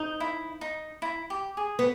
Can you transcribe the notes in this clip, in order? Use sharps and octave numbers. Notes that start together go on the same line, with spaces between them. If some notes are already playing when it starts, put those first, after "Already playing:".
Already playing: D#4
E4
D#4
E4
G4
G#4
B3